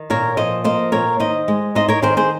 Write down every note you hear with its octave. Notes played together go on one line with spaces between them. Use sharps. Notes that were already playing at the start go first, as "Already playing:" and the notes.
Already playing: D#3
A#2 A#4 C#5
F3 C5 D#5
A#3 C5 D#5
A#2 A#4 C#5
D#3 C5 D#5
G#3
D#4 C5 D#5
A#4 C#5
D#3 G#4 C5
G#4 C5